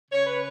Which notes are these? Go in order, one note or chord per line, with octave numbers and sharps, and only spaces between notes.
C#3 C#5
B4